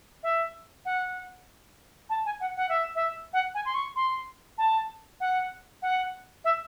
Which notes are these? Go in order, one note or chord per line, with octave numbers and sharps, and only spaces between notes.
E5
F#5
A5
G#5
F#5
F#5
E5
E5
F#5
G#5
C6
C#6
C6
A5
F#5
F#5
E5